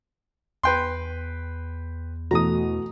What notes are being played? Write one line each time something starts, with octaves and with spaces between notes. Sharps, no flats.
E2 B4 G5 C6
B2 E3 A3 F#4 A#5 D#6